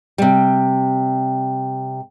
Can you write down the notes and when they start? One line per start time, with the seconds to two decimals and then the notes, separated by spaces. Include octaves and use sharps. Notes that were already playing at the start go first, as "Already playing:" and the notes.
0.18 C3 G3